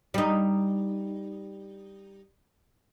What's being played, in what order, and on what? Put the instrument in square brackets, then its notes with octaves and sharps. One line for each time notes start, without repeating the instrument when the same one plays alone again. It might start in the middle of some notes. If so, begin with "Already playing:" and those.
[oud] G3 D#4